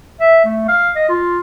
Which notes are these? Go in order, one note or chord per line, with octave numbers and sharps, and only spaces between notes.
E5
A3
F5
D#5
F4